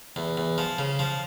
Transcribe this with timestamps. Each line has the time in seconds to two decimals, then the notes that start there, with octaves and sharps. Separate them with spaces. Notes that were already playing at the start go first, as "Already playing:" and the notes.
0.16 E2
0.37 E2
0.58 F3
0.79 C#3
0.99 F3